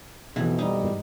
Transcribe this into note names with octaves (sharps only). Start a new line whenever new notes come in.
B1 F2 B2 E3
G3 D#4
G#2